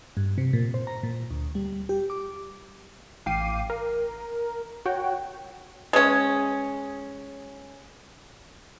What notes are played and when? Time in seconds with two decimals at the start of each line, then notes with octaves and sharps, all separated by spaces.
0.17 G2
0.38 C3
0.53 A#2
0.74 C5
0.87 A#5
1.03 A#2
1.31 D2
1.55 G3
1.89 G4
2.10 D6
3.26 A1 F5 G5 D6 C7 D#7
3.70 A#4
4.86 F#4 C#5 F#5 G5
5.93 G#3 C#4